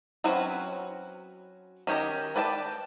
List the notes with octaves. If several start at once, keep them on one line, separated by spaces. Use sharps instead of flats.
F#3 C4 C#4 F#4 B4
D#3 C#4 G4 D#5 A#5
B4 D5 G5 A5